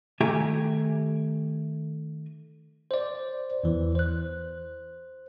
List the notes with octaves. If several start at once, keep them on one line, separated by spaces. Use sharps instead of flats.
D#3 A3 G4 G#5 A#5
C5 D5
E2 E3
C5 F#6